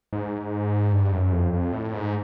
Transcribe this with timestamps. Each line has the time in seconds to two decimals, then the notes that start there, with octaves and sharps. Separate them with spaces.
0.13 G#2
0.93 G2
1.12 F#2
1.32 F2
1.53 F2
1.73 A2
1.94 G#2